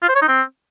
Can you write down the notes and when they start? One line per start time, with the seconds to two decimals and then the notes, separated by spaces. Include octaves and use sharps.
0.02 F4
0.09 C5
0.15 C#5
0.22 D#4
0.28 C4